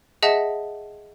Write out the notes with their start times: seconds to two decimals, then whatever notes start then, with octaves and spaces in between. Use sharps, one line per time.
0.23 G#4 D#5 E5 F#5 A5